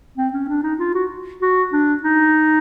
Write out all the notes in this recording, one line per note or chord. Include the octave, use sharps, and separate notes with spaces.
C4
C#4
D4
D#4
F4
F#4
F#4
D4
D#4